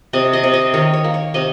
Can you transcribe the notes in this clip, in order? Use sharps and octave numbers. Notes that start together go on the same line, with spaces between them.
C3 D#5
D#5
C3
D#5
D#3 C#5
C#5
A#3
C#5
C3 D#5